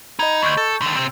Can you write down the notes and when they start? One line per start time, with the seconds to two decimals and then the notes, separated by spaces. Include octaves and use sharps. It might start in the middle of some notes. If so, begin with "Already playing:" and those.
0.19 D#4 D#5 B5 G#6
0.42 D2 C#6 G6
0.57 A4
0.82 D3 D#3
0.96 C3 C4